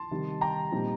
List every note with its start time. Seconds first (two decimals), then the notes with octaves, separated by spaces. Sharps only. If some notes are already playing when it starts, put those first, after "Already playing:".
Already playing: A5 C6
0.11 C3 D#3 G3
0.41 G5 A#5
0.72 A#2 G3 C4 D#4